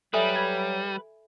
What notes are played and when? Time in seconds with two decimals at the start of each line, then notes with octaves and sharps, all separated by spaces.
0.14 F#3 G3 A4 B4 E5 G#5
0.35 D5 B5